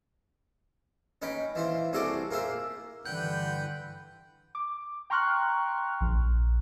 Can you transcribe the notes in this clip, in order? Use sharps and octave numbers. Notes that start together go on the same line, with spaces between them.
C#4 D#4 B4 G5
E3 F4 C5
C2 F#4 G#4 A4 C5 D6
A#3 F4 G#4 C5 E5
G2 D3 E3 B4 F#5 G5 G6
D6
G5 A#5 C6 C#6 F6 F#6
A#1